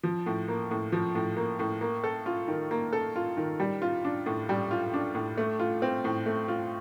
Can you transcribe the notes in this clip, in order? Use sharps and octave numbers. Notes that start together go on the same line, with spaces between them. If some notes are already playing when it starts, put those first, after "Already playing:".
F3
A2
A#3
A2
F3
A2
A#3
A2
A#3
A4
F4
D#3
A#3
A4
F4
D#3
G3
F4
D4
A2
G3
F4
D4
A2
A3
F4
C4
A2
A3
F4